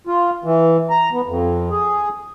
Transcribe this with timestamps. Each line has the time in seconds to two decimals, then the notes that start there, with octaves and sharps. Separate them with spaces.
0.07 F4
0.44 E3
0.90 A#5
1.13 B3
1.26 F2
1.71 G#4